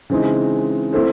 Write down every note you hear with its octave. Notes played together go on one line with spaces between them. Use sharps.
C#3 E3 G#3 C4 D#4
A3 C4 E4 A4 C5